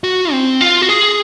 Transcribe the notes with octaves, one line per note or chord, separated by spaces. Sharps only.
F#4
C4
F4
F#4
G#4